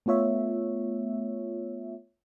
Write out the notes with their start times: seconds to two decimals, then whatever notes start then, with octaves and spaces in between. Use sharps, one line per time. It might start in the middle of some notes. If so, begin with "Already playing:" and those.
0.06 A3 B3 F4 C#5 E5